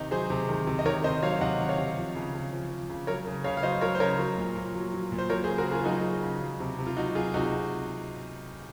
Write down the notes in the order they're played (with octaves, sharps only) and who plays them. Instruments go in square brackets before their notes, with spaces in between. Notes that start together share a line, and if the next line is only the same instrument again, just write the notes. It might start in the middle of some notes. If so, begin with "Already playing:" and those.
Already playing: [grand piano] C3 D#3 D#4
F#3 G#4 C5
C3
D#3
C3
D#5
D#3 A#4 C#5
C3 C5 D#5
F#3 C#5 F5
C3 D#5 F#5
D#3
C#5 F5
C3
F3
C#3
C#3
F3
F3
C#3
F#3 A#4 C#5
C#3
C#3 C#5 F5
F5
F#3 C5 D#5
F#3 A#4 C#5
C5
C#3 A#4 C#5
F#3
A#2
A#2
F#3
F#3
A#2
C5
F#3 A#4 C#5
G#4 C5
C#3
F#4 A#4
C#3 F4 G#4
F4
F#3 D#4 F#4
F#3
C#3
F#3
C3
C3
F4
F#3 D#4 F#4
F#3 F4 G#4
C3 D#4 F#4